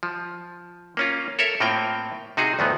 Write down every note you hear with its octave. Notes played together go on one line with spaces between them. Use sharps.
F3
A#3 C#4 F4
A4 A#4 C#5 E5
A2 A#3 C4 F4 G5
C3 D#4 F#4 G#4
D2 A2 F3 F#3 B3